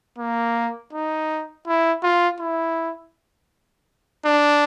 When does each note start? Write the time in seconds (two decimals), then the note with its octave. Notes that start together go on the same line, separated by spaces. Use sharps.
0.18 A#3
0.93 D#4
1.67 E4
2.03 F4
2.40 E4
4.25 D4